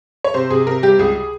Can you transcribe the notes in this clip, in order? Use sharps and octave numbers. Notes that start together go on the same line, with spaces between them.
C#5
C3 C5
C3 G#4
C3 A#4
G3 G4
C#2 G#4